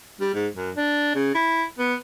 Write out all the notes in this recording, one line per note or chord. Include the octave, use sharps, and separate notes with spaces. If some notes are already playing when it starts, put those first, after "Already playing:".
G3
G#2
F#2
D4
C#3
E4
B3